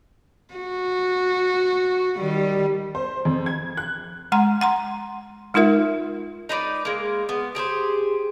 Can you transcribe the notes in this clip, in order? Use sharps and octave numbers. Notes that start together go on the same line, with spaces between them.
F#4
D#3 G3
C5
F2
G#6
F#6
G#3 F#5 A#5 C6
F#5 A#5 C6
G#3 D#4 F4 A#4 E5
D#4 B4 C5 D5
G#3 A#3
B3
G4 G#4 A#4 C5